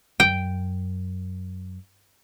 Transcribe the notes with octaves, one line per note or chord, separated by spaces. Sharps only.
F#2 G5